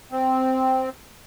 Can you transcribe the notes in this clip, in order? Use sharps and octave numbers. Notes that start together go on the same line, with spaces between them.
C4